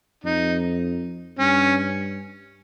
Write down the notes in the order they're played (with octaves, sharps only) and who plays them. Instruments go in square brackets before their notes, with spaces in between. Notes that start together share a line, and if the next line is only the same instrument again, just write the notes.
[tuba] F2 [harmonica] D#4
[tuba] G2 [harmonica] C#4